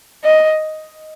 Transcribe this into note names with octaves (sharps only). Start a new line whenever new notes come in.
D#5